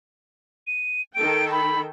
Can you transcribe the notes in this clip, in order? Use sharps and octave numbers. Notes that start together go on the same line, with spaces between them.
D#7
D#3 A4 G5 D7
B5